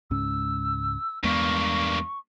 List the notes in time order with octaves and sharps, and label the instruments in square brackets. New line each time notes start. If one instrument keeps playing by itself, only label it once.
[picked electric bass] C#2 G#2 C#4 [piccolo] E6
[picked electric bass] E2 G#3 B3 [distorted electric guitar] G2 A#3 [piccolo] C#6